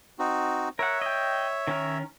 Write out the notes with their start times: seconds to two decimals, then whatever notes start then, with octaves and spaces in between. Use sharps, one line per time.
0.19 C4 D#4 F#4
0.79 A#4 C#5 E5 F#5
1.02 D#5 G5
1.67 D#3 C#4 A#4